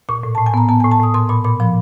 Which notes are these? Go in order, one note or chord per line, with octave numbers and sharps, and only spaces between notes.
A#2 C#6
A2
A2 A5
G#5
B3 A#5
B3 A5
A2 G#5
A5
A2 D#6
A#2 C6
A#2 B5
A#2 B5
F3 B5